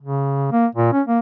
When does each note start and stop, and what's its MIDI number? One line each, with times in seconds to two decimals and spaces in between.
0.01 0.49 49
0.52 0.66 58
0.75 0.91 46
0.93 1.02 61
1.08 1.19 58